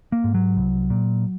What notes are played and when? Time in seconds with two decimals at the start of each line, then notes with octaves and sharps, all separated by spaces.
0.12 A#3
0.24 G#2
0.34 F#3
0.57 C2
0.90 A#2